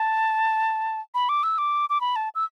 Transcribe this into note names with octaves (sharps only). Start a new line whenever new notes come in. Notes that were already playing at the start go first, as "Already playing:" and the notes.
Already playing: A5
B5
D6
E6
D6
D6
B5
A5
E6